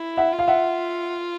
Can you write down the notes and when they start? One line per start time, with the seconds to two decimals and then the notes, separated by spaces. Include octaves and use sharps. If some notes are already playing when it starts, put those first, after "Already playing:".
Already playing: E4
0.17 E5 F#5
0.33 F4
0.39 F5
0.48 E5 F#5